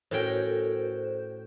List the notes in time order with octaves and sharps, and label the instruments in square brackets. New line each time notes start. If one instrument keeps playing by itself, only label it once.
[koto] A2 C#4 G5 [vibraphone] F#4 A4 A#4 [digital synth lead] C5